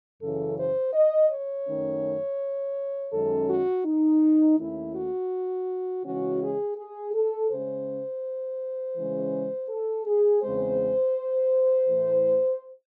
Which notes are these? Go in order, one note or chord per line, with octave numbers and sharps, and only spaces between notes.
F#2 C#3 E3 A4
C5
D#5
C#5
F#2 D#3 A3 C#4
F#2 D#3 G#3 C#4 A4
F#4
D#4
D#2 D#3 A3 C#4 E4
F#4
C#3 E3 G#3 C#4 F#4
G#4
G#4
A4
C#3 G#3 C#4 C5
C#3 E3 G#3 C#4
A4
G#4
E2 C#3 G#3 C4 C5
A2 E3 A3